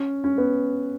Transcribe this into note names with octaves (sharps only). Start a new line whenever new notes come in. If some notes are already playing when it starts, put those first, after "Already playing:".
Already playing: C#4
C#4
B3